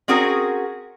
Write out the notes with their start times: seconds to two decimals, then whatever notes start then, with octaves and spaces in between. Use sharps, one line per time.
0.08 C4 C#4 F#4 G#4 A#4